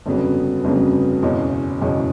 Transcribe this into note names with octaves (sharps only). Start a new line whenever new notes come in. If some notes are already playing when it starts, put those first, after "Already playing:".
G1 F2 C#3 F#3 B3
G1 F2 C#3 F#3 B3
F#1 E2 B2 G#3 C#4
F#1 E2 B2 G#3 C#4